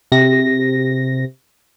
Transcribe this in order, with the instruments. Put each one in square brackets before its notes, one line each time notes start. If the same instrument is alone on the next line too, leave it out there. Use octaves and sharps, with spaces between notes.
[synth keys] C3 A#6